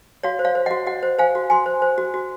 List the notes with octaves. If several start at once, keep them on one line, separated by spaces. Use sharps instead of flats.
F#4 C#5 F5
C5
C#5 F5
C5
D#5 F#5
F#4
F#4 D#5 F#5
C5
C5 F5 G#5
F#4
F#4 G#5 C6
C5
C5
F#4
F#4